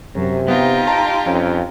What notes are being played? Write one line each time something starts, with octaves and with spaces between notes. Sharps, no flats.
F#2 C3
B3 D#4 F4 G4
A5 A#5 C6
F2 C#4